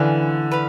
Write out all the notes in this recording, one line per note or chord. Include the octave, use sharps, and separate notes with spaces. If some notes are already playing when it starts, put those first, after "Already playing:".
Already playing: D3 E3 B4 F5 G#5
B4 F5